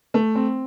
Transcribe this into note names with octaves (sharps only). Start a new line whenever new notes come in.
A3
C4